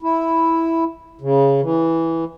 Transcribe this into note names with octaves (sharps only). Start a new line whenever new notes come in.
E4
C#3
E3